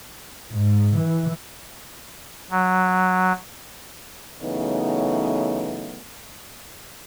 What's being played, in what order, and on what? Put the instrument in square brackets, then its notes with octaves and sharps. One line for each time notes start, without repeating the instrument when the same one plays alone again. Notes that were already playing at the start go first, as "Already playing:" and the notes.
[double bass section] G#2
E3
[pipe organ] F#3
[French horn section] C#3 E3 F#3 A3 B3 D#4